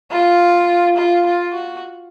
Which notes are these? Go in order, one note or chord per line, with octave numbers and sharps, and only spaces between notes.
F4
F4
F4
F#4